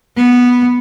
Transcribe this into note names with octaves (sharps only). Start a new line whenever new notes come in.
B3